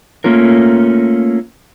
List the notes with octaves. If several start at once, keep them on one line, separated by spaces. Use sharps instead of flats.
A3 A#3 C#4 F4 A#4